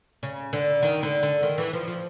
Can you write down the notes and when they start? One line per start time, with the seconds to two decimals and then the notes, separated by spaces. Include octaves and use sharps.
0.23 C#3
0.53 D3
0.83 D#3
1.03 D3
1.23 D3
1.43 D#3
1.58 E3
1.73 F3
1.88 F3